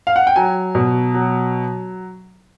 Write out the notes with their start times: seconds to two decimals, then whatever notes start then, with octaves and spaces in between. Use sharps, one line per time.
0.07 F5
0.16 F#5
0.27 G5
0.36 F#3 G#5
0.75 B2
1.14 F#3